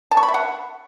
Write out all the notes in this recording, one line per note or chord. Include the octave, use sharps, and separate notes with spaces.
A5
C#6
B5
E5
F#5